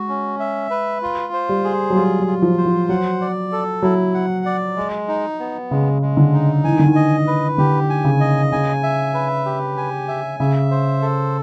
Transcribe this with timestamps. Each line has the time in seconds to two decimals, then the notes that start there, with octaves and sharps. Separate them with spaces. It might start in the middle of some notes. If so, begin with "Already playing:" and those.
Already playing: G#3 F#4
0.09 C#4
0.39 E5
0.70 B4
1.02 F4
1.33 C5
1.49 G3
1.64 G#4
1.90 F#3
1.96 G3 F4
2.20 F#3
2.27 F4
2.42 F3
2.57 C5
2.66 F3
2.89 F#3 F#5
3.21 D5
3.52 A4
3.82 F#3 E4
4.14 F#5
4.46 D5
4.76 G#3
5.08 D#4
5.39 B3
5.71 C#3 G#3
6.02 G#3
6.17 D3
6.33 D#4
6.64 E3 G#5
6.72 D#3
6.79 D3
6.86 D#3
6.95 D#5
7.27 B4
7.58 D3 G4
7.90 G#5
8.04 C#3
8.20 D#5
8.52 C#3 G#5
8.83 E5
9.14 B4
9.46 G4
9.77 G#5
10.08 E5
10.40 C#3 E5
10.71 C5
11.02 A4